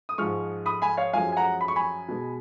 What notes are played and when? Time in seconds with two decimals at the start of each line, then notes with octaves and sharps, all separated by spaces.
0.09 D#6
0.18 G#2 F3 G#3 C#6 F6
0.66 B5 D#6
0.82 G#5 B5
0.97 C#5 F5
1.13 F#2 F3 G#3 F5 G#5
1.32 G#5
1.37 F#5 A#5
1.61 B5
1.68 C#6
1.76 G#5 B5
2.09 B2 G#3